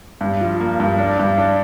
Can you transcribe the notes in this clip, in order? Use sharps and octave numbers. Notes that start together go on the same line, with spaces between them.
G2
F3
A#3
G2
D4
G2
D4